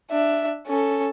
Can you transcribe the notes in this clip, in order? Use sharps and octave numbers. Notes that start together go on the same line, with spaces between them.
D4 E5
C#4 A4